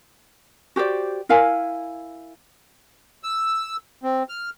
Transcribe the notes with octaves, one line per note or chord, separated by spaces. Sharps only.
F#4 G4 C5 D5
E4 A#4 F5 G#5
E6
C4
F6